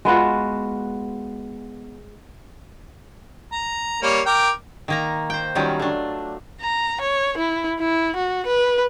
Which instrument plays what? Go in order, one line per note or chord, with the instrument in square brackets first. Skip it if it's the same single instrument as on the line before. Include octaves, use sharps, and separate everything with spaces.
[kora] G#3 B3 F4 F#4
[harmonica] A#5
G3 A#3 C#5
A#4 G5 D6
[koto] D#3 A#3 A#5
C5 G5
D#3 F#3 G3 C#4 F4
A3 D4
[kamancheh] A#5
C#5
E4
E4
F#4
B4